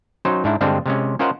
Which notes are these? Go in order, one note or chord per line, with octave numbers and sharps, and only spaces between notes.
F#3 C#4 D#4 C5
G#2 D4 E4
G2 D3 G3 G#3 C4 D4
C3 G#3 C#4
C#4 F4 A#4 C5 D#5 F#5